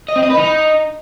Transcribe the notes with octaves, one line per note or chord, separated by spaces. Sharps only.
D#5
C4
D#5
B4
D#4